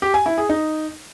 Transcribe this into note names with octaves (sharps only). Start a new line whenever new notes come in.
G4
G#5
E4
G#4
D#4